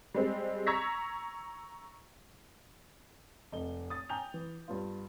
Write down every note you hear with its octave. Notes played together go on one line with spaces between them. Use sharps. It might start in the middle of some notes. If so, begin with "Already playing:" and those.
G3 G#3 C4
A#5 C#6 E6 G#6 A#6 B6
F1 D#5 G7
D#6 A6
G5 G#5 A#5 G6 F7
E3
G2 B3 F4